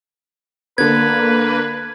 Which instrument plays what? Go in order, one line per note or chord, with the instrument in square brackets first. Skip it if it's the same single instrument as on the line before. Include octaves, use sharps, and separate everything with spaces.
[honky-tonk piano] D3 B3 [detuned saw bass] A#3 [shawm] B4 [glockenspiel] G#6